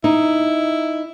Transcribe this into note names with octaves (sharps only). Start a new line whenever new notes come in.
D#4 E4